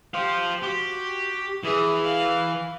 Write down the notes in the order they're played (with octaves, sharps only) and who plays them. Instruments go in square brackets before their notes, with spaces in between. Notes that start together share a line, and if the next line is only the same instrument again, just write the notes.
[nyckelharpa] G4 [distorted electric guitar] C5 F5
[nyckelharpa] F#4 [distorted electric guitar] G4
[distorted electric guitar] E3 [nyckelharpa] G#4 E5
[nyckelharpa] F5